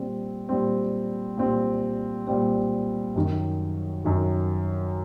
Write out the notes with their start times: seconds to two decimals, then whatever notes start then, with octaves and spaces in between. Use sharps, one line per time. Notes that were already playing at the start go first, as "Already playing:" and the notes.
Already playing: A#2 G3 C4
0.49 A#2 G3 C4
1.38 A#2 G3 C4
2.27 A#2 G3 C4
3.15 F#2 D#3 F#3
4.04 F#2 D#3 F#3